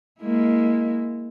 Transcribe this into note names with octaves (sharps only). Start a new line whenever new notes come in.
G#3 A#3 E4